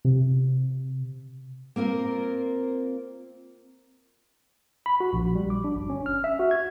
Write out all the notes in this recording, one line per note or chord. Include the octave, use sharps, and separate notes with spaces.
C3
A#3 C4 F4 A#4
B5
F#4
A#1
G3
D6
D4
G1
C#4
F6
E5
F#4
G#6